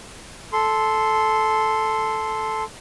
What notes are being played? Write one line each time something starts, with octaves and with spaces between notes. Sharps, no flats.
A4 C6